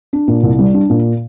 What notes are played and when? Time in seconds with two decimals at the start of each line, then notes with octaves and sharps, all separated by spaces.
0.13 D4
0.28 A#2
0.43 C2
0.59 G3
0.74 D4
0.90 A#2